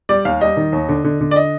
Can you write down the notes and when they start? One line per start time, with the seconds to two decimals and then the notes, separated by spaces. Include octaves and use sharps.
0.09 G3 D5
0.25 D#2 F5
0.41 G3 D#5
0.57 D#3
0.73 D#2
0.89 D3
1.04 D3
1.21 D3
1.31 D5
1.36 D#5